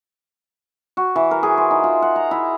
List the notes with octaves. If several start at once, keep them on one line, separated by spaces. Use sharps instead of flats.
F#4
E3
A#4
G#4
C5
D#4
F4
F#5
A#5
E4